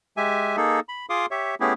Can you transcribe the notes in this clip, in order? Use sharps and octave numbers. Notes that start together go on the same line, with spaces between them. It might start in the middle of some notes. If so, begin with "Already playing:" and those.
G#3 G4 E5 G#5
A#3 D#4 G#4 A4
B5
F4 G#4 F5 C6 D6 D#6
G4 C#5 E5
A3 B3 C#4 E4 G4 G#4